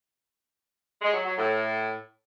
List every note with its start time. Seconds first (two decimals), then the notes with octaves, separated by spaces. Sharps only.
1.02 G#3
1.13 F#3
1.25 F#3
1.37 A2